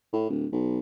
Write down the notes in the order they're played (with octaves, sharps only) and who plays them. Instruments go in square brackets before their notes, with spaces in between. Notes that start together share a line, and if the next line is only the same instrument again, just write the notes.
[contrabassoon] A2
D1
B1